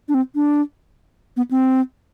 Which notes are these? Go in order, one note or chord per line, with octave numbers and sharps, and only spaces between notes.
D4
C4
D4
B3
C4